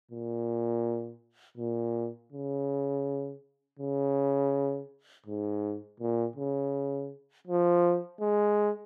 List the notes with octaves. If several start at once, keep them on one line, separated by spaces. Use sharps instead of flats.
A#2
A#2
C#3
C#3
G#2
A#2
C#3
F3
G#3